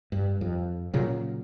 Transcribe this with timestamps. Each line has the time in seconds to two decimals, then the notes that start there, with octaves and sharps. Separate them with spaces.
0.12 G2
0.41 F2
0.94 A#2 C#3 F#3